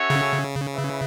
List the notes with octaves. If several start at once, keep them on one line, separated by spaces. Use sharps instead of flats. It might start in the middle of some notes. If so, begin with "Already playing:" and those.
Already playing: C#4 F#4 A4 C#5 E5
C#3
E4 B4 E5